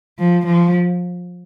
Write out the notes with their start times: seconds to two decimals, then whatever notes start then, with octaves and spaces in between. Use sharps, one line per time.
0.19 F3
0.47 F3